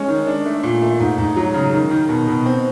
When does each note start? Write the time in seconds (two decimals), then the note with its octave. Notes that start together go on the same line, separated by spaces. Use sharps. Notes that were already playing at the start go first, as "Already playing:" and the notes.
Already playing: G#3 C#4
0.08 D#3
0.27 D4
0.46 A3
0.63 A#2
0.82 A3
1.00 G#2
1.18 G#2
1.36 F#3
1.54 C#3
1.73 D#3
1.91 D#3
2.09 B2
2.27 B2
2.46 C4